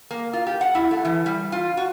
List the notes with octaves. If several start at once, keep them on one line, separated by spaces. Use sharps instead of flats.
A#3
F4
G4
F#5
E4
A3
E3
G3
F4
F#4